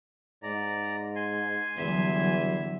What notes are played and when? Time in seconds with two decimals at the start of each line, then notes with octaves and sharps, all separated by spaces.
0.43 G#2 D5 A#5
1.16 G#5 C6
1.77 E2 D3 F#3 G3 E5